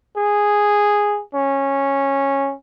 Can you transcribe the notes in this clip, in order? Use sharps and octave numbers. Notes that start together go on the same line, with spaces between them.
G#4
C#4